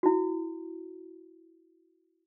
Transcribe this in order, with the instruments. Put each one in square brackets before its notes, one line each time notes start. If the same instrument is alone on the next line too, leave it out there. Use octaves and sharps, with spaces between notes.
[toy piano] E4 F#4